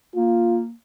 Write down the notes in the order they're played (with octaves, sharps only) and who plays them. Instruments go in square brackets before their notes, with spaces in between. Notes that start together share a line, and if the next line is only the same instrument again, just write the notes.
[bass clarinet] A#3 [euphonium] F4